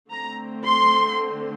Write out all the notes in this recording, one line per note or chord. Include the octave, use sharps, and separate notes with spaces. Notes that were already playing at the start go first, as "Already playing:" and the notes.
D3 A3 C4 A#5
C6